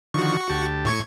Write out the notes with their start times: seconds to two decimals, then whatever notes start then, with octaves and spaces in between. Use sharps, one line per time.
0.14 D3 D#3 F3 F#4 C#6
0.49 D2 G4 A5
0.85 A2 C#6 G#6